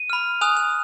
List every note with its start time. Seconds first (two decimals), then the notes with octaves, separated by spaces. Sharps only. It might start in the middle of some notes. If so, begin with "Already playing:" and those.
Already playing: D#7
0.10 B5 F6
0.41 G#5 D#6 F#6 F7
0.57 F7